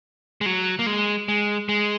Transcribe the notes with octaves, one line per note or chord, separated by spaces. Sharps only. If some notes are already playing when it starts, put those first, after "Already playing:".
G#3
F#3
A#3
G#3
G#3
G#3